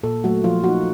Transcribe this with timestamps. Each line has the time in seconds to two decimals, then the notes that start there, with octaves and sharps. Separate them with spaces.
0.03 A#2 A4
0.24 F#3 A3 F#4
0.44 F3 F4
0.64 A#3 D#4 F#4